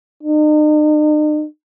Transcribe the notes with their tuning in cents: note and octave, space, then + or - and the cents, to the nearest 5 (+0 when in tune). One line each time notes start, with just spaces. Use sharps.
D#4 -45